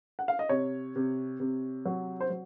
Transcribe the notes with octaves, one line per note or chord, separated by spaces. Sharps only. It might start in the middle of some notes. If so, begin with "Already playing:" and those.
F#5
F5
D#5
C3 C#5
C3
C3
F#3
C5
F#3